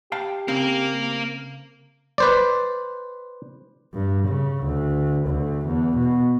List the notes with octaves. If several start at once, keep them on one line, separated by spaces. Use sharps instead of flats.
G4 F5 G5 A5
C#3 C4 A#4 F5
B4 C5 D5
G2
C#3
D2
D2
E2
B2